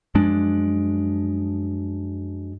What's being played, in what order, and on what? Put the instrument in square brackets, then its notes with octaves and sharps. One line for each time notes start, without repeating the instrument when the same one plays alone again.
[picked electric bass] F#2 F3 G#3 D4